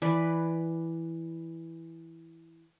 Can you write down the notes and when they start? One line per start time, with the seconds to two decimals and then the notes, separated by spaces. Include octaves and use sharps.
0.02 E3 B4 D5